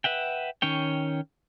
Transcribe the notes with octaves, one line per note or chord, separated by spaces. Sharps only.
B4 E5 F#5 G5
D#3 C#4 C#5 G5